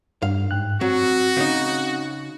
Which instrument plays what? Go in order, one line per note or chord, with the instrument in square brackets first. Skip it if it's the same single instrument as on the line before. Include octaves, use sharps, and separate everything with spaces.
[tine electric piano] G2 [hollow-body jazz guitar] F5
[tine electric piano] G#2 G5 F#6
[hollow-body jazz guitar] F#3 [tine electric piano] C4 [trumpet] F#4
[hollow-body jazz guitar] C#3 D#4